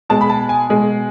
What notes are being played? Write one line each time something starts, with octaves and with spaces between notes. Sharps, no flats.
B2 G#3 A5
B5
A5
G#5
B2 G#3